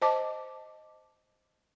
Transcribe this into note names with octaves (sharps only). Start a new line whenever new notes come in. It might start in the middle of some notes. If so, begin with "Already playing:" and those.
C5 D#5 A5 D6